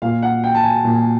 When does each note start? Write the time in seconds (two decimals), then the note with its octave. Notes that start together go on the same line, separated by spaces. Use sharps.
0.02 A#2 F5
0.23 F#5
0.44 G5
0.55 A5
0.64 G#5
0.84 A#2